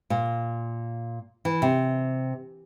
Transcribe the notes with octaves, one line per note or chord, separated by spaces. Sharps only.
A#2
E3
C3